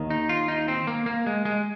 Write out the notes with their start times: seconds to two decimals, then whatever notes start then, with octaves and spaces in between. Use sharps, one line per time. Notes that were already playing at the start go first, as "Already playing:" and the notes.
Already playing: D#2 D#3
0.10 D#4
0.29 F4
0.48 D#4
0.68 C4
0.87 A#3
1.06 A#3
1.26 G#3
1.45 G#3